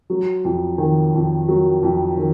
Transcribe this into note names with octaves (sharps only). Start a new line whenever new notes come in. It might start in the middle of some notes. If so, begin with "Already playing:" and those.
F#3
F2
D#3
F2
F#3
F2
D#3